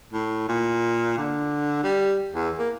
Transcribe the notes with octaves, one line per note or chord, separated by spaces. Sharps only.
A2
A#2
D3
G3
E2
A#3